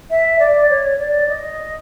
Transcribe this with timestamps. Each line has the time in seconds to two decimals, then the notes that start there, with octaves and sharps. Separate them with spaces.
0.10 E5
0.39 D5
0.70 C#5
0.99 D5
1.29 D#5